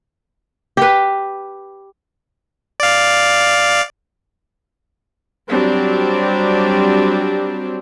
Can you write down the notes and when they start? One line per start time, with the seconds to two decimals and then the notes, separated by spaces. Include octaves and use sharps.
0.77 G4 B4
2.80 D5 F5
5.50 F#3 G3 C4 D4